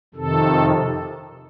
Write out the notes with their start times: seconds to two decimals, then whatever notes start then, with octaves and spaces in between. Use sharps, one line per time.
0.14 F2 C3 D#3 A4